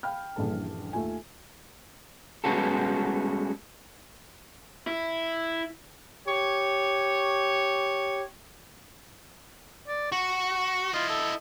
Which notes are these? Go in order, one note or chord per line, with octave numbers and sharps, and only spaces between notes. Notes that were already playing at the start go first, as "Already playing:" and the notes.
F5 G5 B5 F6
D#1 A#1 G2 E3 A4 A5
D#2 A3 F4 G#5
G3 G#3 B3 C#4 F#4 A4
E4
G4 C#5
D5
F#4 C#6
E4 F4 D#5
A4